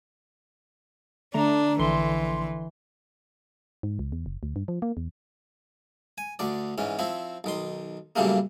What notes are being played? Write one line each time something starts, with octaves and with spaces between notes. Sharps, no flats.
D3 A3 D4 A#5
A#1 D3 E3 C6
G#2
C#2
E2
F#1
D2
G2
F3
A#3
E2
G#5
D2 D3 D5
G#2 E3 C#4
F3 C4 E4
B1 D#3 C6
F#2 A#2 C#3 G3 A3 A#3